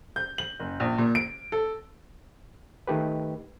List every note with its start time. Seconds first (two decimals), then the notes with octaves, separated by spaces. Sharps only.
0.16 G6
0.38 F#7
0.60 F#1
0.80 A#1
0.98 A#2
1.15 D7
1.52 A4
2.87 D#3 A3 G4 B4